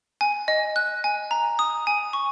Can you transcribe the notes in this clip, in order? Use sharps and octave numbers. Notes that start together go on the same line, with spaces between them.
G#5
D#5
F#6
G#5
A#5
D#6
G#5
C#6